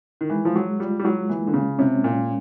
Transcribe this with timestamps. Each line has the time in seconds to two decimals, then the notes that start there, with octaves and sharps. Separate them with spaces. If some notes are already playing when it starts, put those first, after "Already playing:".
0.21 D#3
0.30 E3 G#3
0.45 F3
0.55 F#3 G#3
0.80 G3 F4
0.99 G3
1.04 F#3 G#3
1.29 E3 A#3
1.47 D3
1.54 C#3 C#4
1.79 C3 C#4
2.04 A#2 A#3